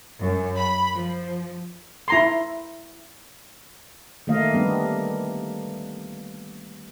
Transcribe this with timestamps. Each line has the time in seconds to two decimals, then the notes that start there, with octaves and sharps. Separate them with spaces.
0.19 F#2
0.56 B5
0.94 F3
2.08 E4 A#5 C6
4.27 D#3 A3 A#3 D#5 F5
4.53 G3 B3 D4